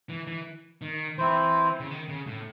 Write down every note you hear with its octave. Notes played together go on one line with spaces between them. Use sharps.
E3
E3
D#3
E3 C4 E4 C5
C#3
D#3
C#3
A2